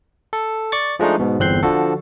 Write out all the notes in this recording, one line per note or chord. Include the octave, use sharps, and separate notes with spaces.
A4
D5 C#6 A6
F3 G#3 A3 D4 D#4
G#2 B2
G1 E2 C4 F#6 G6 C7
D3 F3 F#4 A4